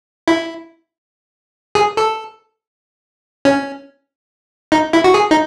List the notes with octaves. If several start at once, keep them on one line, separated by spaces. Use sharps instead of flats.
E4
G#4
A4
C#4
D#4
E4
F#4
G#4
D#4